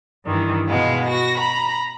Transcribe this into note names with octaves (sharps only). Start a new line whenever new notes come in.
G2 D#3 E3
B2 G#3 F5
F#4 A#6
A#5 B5